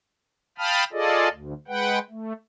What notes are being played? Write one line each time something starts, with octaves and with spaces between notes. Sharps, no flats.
F5 G5 A5 B5 D#6 F6
F4 G#4 A4 D5 D#5
D2
G#3 B4 F#5 G5
A3